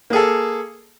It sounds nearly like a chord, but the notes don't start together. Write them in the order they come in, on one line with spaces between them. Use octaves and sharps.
A#3 G#4 A4